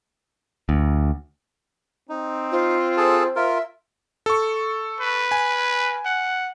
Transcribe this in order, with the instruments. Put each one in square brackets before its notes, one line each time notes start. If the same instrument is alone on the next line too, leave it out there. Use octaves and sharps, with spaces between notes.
[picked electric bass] D2
[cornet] C4 [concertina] D#4
[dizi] F4 [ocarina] C5
[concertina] G#4 A4 A5
[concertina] F4 A#4 [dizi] E5
[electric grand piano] A4 C#6
[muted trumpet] B4
[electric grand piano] G#5
[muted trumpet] F#5